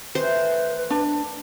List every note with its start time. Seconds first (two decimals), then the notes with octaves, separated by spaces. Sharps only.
0.15 D#3 E3 A3 B4 C5
0.90 D4